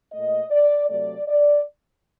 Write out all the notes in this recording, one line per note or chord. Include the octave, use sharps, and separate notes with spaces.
A#2 A3 D#5
D5
C3 F#3 A3 D5
D5